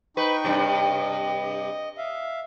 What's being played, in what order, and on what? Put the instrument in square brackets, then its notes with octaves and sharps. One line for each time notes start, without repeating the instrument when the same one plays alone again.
[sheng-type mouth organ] D#4 G5 C#6 [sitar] B4
[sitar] G2 C3
[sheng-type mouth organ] D#5
E5 F5